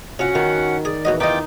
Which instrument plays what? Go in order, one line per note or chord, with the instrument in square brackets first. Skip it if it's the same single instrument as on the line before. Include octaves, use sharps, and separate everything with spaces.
[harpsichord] C3 F4 [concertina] C#4 F#5 [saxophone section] F#4
[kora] D#3 [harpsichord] F4
[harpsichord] G#4 [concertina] D5
[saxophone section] E2 E3 [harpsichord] B2 F#3 D#5 [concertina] F#4
[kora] D#4 [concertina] F4 G5 D6 [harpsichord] B4 D#5